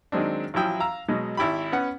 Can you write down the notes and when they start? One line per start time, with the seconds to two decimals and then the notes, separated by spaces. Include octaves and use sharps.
0.12 D#3 F#3 G#3 C4 D4
0.54 A1 F3 F#3 E4 G5 D#6
0.80 F5 A#5 E6
1.08 B2 F#3 G#3
1.37 G#1 E4 G4 B5
1.72 B3 C#4 F#5